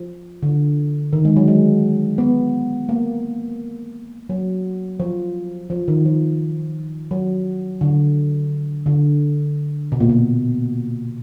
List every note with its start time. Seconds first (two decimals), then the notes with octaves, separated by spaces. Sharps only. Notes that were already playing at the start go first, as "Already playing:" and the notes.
Already playing: F3
0.43 D3
1.13 D#3
1.25 G#3
1.36 F#3
1.48 G#3
2.18 B3
2.89 A#3
4.29 F#3
5.00 F3
5.70 F3
5.88 D#3
6.05 F3
7.11 F#3
7.81 D3
8.86 D3
9.92 B2
10.00 A#2
10.09 B2